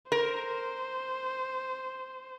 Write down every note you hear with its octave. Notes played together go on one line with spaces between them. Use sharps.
A#4 C5